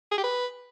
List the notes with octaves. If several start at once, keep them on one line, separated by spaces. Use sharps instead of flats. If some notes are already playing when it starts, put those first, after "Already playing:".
G#4
G4
B4